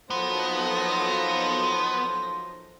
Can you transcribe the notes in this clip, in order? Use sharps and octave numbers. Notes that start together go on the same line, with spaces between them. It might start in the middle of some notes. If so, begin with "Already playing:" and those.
F3 F#3 A#3 B3 D#4 A4 C5 A#6